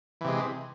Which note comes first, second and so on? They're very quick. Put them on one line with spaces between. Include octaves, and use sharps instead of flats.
E3 C3 G#3